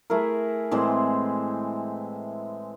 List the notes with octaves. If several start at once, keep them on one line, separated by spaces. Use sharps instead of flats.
A3 E4 G#4 A#4
A2 E3 G#3 C4